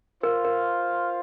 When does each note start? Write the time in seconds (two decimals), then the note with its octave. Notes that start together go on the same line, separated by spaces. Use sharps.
0.23 F4 A#4 C5 F5
0.45 A#4